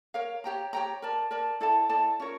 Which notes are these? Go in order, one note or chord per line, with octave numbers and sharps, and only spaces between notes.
A#4 C#5 F5
G4 C#5 G5 A#5
G4 C#5 G5 A#5
A#4 D5 A5
A#4 D5 A5
E4 A4 D5 A5
E4 A4 D5 A5
C#4 F4 A#4 C#5